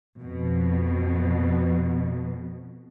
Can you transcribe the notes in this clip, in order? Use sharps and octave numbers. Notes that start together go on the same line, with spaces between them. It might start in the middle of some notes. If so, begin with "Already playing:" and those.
F2 B2